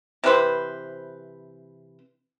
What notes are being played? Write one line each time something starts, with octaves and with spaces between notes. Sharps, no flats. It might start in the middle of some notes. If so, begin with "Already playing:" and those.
C3 E3 B4 C5